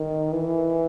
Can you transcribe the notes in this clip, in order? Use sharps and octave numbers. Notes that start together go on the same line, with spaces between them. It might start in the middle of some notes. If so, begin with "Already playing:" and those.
Already playing: D#3
E3